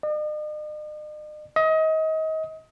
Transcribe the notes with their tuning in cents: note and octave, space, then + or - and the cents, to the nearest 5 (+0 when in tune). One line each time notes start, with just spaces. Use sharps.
D#5 -45
D#5 +30